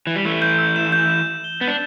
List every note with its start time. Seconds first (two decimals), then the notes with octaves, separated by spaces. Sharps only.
0.07 E3
0.16 G3
0.25 E3 A3 E6
0.42 G6
0.58 E6
0.76 E7
0.92 G6
1.09 E7
1.27 G6
1.44 G7
1.61 B3 A6
1.68 D4